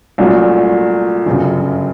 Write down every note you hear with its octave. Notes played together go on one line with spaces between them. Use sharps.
C2 A#2 F#3 A3 C#4
G1 F#2 C#3